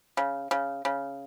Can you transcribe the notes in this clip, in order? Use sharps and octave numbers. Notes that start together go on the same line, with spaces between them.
C#3
C#3
C#3